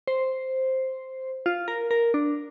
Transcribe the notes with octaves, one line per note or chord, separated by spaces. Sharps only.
C5
F4
A#4
A#4
D4